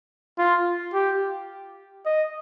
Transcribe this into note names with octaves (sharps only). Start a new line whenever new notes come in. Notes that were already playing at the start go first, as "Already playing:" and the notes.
F4
G4
D#5